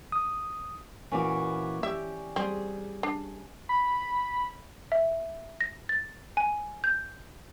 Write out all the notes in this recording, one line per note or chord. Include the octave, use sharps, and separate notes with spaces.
D#6
A#2 E3 C#4 F#4 D6
G4 D5 E5
G3 C4 G#4
D4
B5
E5
A#6
A6
G#5
G6